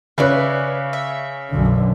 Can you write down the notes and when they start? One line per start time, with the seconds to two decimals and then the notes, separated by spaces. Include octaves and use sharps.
0.18 C#3 C#4 B4 D5 E5 F#6
0.93 E5
1.50 B1 F#2 D3